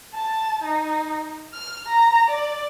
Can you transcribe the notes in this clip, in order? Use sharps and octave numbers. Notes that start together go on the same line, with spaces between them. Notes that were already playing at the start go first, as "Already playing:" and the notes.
A5
D#4
F6
A#5
D5